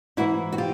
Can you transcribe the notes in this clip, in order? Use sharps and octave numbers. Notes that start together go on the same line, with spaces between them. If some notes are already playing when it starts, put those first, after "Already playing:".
G#2 E3 E4 F#4
F#4
F4 G4